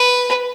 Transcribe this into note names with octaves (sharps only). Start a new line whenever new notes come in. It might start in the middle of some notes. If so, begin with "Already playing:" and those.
Already playing: B4